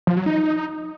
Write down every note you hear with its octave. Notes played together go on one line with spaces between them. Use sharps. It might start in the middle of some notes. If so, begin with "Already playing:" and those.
F3
F#3
D#4